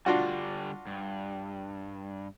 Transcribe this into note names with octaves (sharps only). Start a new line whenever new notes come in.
D3 G3 D4 F4 F#4
G2